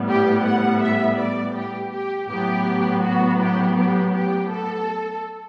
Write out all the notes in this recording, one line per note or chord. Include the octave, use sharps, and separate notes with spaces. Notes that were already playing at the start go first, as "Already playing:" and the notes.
Already playing: A2 G3 B3
G4
F#5
E5
D5
G4
G4
A2 F#3 B3 G4
F#4
G4
G4
G4
A4